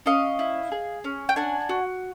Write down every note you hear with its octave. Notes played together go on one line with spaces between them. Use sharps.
C#4 D#5 F5
E4
G#4
C#4
G5
D4 F#5 G#5
F#4